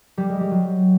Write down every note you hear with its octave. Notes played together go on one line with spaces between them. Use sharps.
G3
G#3
G3
F#3